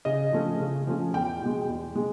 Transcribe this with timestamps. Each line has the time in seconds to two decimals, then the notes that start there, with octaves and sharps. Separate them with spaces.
0.05 C#3 D#5
0.32 F3 A3 C#4
0.60 C#3
0.87 F3 A3 C#4
1.14 E2 G5
1.41 B2 G#3
1.68 E2
1.96 B2 G#3